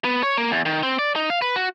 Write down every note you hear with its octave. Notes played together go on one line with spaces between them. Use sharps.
B3
C#5
A#3
E2
D#3
C4
D5
D#4
F5
B4
F#4